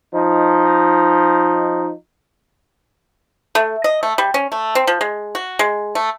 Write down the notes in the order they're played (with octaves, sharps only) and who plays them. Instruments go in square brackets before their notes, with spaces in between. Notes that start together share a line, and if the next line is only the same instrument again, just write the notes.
[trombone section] F3 D#4
[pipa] A3
D#5
A3
G3
C#4
A3
C4
F3
G#3
F#4
G#3
A3